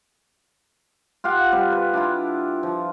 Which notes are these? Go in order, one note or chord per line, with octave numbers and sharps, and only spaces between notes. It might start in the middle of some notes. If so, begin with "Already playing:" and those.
F4 G4 F5 F#5
G3 C4
B4
D4 E4 F4
F3